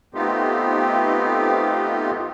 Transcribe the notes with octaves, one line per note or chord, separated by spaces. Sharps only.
A3 B3 C4 D#4 F4 G4